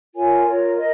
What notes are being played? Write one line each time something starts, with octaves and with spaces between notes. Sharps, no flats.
F4 A#4 C#5 G#5
F4 A#4 C#5
A#4 D#5